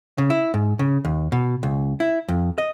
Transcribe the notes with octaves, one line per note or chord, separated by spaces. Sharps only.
C#3
E4
G#2
C#3
D#2
B2
C#2
E4
F2
D#5